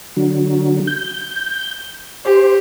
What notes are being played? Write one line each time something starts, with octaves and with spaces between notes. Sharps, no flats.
D3 F#3
G6
G4 C5